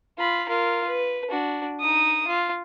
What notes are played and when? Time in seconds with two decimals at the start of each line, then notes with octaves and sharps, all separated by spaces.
0.19 F4 B5
0.49 F4 A#4
0.87 B4
1.29 D4 F#4
1.81 D#4 D#6
2.27 F4